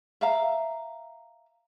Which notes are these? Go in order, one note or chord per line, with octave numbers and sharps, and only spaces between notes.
E5 F5 A#5